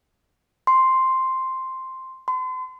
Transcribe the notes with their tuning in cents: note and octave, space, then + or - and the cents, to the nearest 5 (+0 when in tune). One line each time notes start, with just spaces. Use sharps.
C6 +0
C6 -40